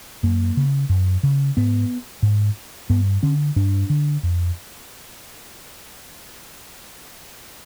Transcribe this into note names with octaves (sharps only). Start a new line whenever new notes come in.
F#2 A#3
C#3
F#2
C#3
G#2 B3
G#2
G2 B3
D3 C#4
G2 D4
D3
F2